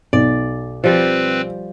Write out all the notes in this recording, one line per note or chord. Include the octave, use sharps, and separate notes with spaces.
B1 D5
F3 G3 C4 B4